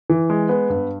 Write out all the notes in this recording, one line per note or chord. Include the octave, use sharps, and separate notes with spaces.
E3
G#3
B3
G2